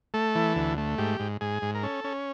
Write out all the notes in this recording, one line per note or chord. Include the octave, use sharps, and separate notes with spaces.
A3 A4
E3
D2
A3
G#2 G4
G#2
G#2 G#4
G#2
A#4
C#4 A4
C#4